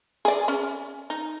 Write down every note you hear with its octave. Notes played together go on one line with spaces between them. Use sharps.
G#4 D5
C#4
D#4